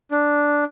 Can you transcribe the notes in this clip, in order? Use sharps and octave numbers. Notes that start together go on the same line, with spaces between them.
D4